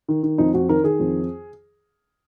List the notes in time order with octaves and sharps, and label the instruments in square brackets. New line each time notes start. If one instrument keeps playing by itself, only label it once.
[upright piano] D#3
D#3
F2 D#4
F2 F#4
D#3 A#4
D#3 G#4
F2